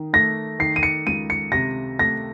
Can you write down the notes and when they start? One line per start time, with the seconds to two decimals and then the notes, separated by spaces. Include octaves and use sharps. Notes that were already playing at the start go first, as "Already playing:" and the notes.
Already playing: D#3
0.13 A3 A#6
0.59 D#3 C7
0.76 D#7
0.83 C#7
1.07 C#2 D#7
1.30 C#7
1.52 C3 A#6
1.99 A3 A#6